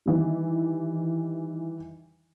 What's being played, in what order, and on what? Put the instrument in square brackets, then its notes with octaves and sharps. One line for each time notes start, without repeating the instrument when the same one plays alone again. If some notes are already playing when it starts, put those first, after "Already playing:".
[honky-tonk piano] D#3 E3 G3